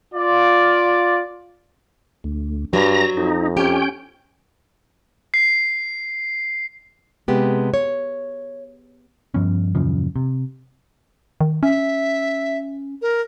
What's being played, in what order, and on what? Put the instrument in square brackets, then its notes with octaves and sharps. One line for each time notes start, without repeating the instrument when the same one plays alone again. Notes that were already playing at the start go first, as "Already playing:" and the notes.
[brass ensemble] F4 D5
[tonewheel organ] D2
[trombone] G2 [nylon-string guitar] F#3 [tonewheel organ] A#5 A#6
[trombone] F2 [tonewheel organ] D#4
[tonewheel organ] C#4 G5 [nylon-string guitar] G4
[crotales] C7
[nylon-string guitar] C3 G#3 B3 G4
C#5
[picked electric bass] G2 F3 B3 C#4
D#1 F#2 C#3 F3
C3
[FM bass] D#3
[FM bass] C#4 [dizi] E5
[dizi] A#4